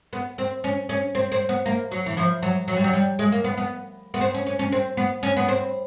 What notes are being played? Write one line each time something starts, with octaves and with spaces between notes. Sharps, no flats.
B3
C4
C#4
C#4
C4
C4
B3
A#3
F#3
E3
F3
F#3
F#3
G3
F#3
G3
G#3
A#3
B3
B3
B3
C4
C#4
C#4
C#4
C4
B3
C#4
B3
C4